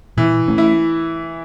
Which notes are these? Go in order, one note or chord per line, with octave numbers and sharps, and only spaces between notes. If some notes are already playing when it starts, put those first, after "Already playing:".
A#2 E3
A3 C#4
E4